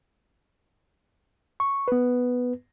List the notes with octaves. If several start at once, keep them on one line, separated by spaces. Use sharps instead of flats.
C#6
B3 B4